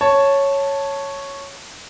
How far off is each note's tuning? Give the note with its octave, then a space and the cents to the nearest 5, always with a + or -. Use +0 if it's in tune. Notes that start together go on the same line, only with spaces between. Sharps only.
C#5 +0 A5 +0